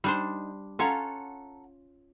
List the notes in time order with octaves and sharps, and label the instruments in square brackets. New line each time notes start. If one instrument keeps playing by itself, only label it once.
[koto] G3 D4 C5 [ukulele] D#4
[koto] C#4 F4 C#5 [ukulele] A4 F#5 A#5